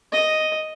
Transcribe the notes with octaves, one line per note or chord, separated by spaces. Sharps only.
D#5